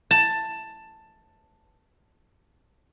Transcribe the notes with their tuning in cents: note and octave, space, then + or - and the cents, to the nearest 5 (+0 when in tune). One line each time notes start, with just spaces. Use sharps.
A5 +10